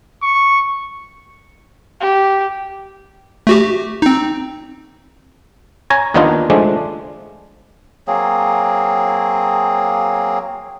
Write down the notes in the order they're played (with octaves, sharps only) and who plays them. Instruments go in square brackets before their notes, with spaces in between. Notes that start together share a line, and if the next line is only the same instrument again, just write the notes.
[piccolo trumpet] C#6
[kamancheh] G4
[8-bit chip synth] A3 F#4 G4
C4 D#4
[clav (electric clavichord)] C#5 G#5 A#5
D#2 D#3 B3 D4 D#4 F4
F3 G#3 A3 D4
[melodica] F#3 A#3 C4 G#4